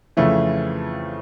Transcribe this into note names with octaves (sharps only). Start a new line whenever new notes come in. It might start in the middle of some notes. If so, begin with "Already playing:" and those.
F2 C#3 E3 A3